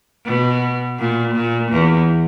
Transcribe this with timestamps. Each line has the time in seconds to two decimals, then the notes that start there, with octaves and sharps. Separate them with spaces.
0.25 B2
0.98 A#2
1.34 A#2
1.72 E2